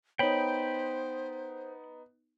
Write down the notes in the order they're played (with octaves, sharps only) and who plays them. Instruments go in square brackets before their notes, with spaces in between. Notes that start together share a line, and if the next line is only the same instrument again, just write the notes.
[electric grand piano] B3 D#4 [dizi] C5 [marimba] C#5 [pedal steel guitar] G5 B5